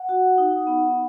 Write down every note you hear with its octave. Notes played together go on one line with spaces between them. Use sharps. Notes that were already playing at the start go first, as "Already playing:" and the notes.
Already playing: F#5
F#4
D#4
B3